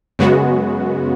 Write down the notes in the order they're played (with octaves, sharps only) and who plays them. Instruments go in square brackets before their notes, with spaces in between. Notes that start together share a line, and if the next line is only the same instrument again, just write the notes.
[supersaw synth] F#2 C#3 G#3 B3 F#4